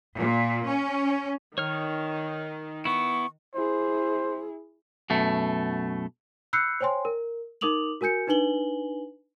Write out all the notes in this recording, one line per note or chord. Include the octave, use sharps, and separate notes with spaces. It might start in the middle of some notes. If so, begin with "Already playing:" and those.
A#2
C#4
D#3 C#5 F6
B3 E4 C#6
E4 G#4 C5
F#2 B2 A3
B5 E6 F#6 G6 C7 C#7
C5 C#5 G5 G#5 C6
A#4
D#4 A#4 D6 D#6 F7 F#7
F#4 A#4 G#5 G6 C#7
D4 D#4 B4 G#5 F#7 G7